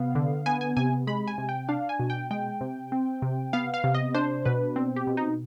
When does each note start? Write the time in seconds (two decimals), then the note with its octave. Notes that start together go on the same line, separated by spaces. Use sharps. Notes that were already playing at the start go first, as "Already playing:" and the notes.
Already playing: C3 B3 F5
0.15 D3
0.46 B3 G#5
0.61 G#5
0.77 C3 G#5
1.07 G#3 B5
1.28 G#5
1.38 C3
1.49 G5
1.68 D4 F5
1.89 G#5
1.99 B2
2.10 G5
2.31 G#3 G5
2.61 C3
2.92 C4
3.22 C3
3.53 B3 F5
3.74 F5
3.84 C3
3.94 D#5
4.14 D4 C5
4.45 B2 B4
4.76 C4
4.96 G4
5.07 B2
5.17 D#4